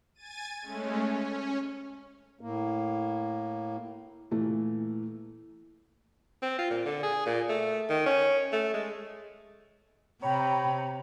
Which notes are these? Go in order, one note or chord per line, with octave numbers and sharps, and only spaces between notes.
G#5 G#6 A6 D#7
G#3 A3 C#4
C#4
A2 A#3
A#2 E3 A3
C4
F4
A#2
D3
G#4
A#2
A3
D#3
C#4
A3
G#3
C3 C#5 G5 A#5 B5